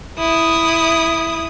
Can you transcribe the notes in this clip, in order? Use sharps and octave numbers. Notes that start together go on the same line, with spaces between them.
E4 D#6